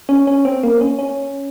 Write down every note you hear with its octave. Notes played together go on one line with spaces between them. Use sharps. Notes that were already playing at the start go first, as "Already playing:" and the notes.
C#4
C#4
C4
A#3
C#4
C#4